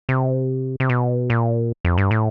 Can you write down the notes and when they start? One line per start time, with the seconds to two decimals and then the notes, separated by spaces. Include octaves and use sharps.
0.09 C3
0.80 C3
0.89 B2
1.30 A#2
1.85 F2
1.98 G2
2.11 A2